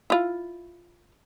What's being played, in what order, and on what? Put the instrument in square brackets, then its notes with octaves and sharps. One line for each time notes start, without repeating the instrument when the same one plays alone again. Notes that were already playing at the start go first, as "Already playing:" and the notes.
[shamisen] E4 F4